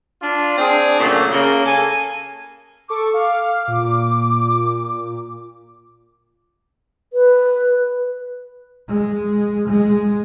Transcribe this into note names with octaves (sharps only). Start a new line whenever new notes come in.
D4 F4
C4 D4 G#4
A#2 C#3 F#3 A3
C#3 A#3
A4 G#5
A4 C#6 D6
F5
A#2
B4
G#3
G#3